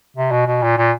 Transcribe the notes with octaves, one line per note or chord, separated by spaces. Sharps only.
C3
B2
B2
A#2
A#2